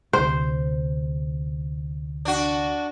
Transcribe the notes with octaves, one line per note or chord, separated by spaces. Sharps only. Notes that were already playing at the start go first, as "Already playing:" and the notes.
D2 C3 C5
D4 F#4